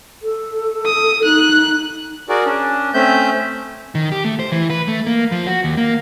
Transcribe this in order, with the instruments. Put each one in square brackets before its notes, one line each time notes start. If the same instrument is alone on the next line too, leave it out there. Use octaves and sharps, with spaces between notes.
[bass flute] A4
[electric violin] D#6
[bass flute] D#4 [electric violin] F#6
[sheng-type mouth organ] F#4 G#4 A#4 D5
C#4 D4
A3 C4 C#4 E5 G6
[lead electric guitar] D#3
G4
A3
C5
E3
B4
A3
A#3
F3
F#4
D#2
A#3